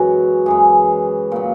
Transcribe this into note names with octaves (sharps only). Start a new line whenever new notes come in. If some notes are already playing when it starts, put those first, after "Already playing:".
Already playing: F#2 E3 G#3 F#4
F#2 E3 G#3 G#4
A#2 F#3